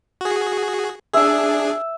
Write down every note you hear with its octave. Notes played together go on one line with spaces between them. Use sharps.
F#4 G#4
D4 G#4 E5